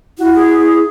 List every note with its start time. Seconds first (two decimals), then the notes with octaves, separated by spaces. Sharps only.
0.19 E4 F#4
0.35 G#4